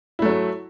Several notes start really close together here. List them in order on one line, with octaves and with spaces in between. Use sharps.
E4 A3 F#3